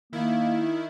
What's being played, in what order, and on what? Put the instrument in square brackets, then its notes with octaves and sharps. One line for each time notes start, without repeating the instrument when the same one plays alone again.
[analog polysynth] D#3 E4 [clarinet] A#3